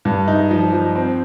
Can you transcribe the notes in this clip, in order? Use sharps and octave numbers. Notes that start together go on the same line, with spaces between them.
G2
D#4
F3
F3
C4